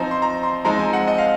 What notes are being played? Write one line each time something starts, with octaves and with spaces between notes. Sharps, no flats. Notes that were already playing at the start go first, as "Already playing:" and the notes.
Already playing: F3 C4 D#4 A#5
C6
A#5
C6
F3 G#3 C4 D#4 A#5
G#5
F#5
D#5
F5